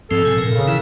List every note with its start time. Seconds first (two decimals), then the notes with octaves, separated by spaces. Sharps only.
0.11 G#2 F3 C4 A4
0.25 C3 G#5
0.38 A#2 A#4
0.54 C#3
0.68 B2 E3 E4